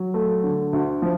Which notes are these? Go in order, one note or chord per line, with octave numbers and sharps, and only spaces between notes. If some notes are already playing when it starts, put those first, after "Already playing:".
Already playing: F#3
A3
D3
D2
F3